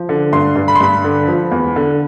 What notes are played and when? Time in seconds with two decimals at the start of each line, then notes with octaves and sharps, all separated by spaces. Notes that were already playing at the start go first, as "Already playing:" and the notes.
Already playing: F3
0.09 D3
0.33 G2 C6
0.56 G2
0.68 B5
0.75 C6
0.80 G2 B5
1.04 D3
1.28 F3
1.51 E2
1.76 D3